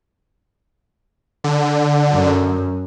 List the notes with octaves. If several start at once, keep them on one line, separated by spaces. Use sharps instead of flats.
D3
F#2